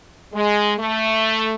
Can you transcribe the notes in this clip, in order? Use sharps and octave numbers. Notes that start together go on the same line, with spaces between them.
G#3
A3